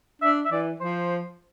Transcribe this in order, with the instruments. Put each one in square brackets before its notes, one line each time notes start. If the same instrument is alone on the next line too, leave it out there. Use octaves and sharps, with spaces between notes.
[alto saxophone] D4 [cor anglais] E5
[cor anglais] E5
[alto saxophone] E3 [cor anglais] D5
[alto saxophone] F3 [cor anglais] C5